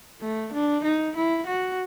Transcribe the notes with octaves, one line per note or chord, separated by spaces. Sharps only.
A3
D4
D#4
E4
F#4